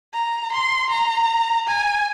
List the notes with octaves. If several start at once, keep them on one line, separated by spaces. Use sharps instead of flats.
A#5
C6
A#5
G#5